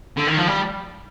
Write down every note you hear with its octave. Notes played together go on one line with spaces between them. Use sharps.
D3
D#3
F3
G3